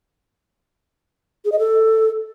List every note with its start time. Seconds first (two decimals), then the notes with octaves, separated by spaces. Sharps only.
1.45 G#4
1.52 D#5
1.59 A4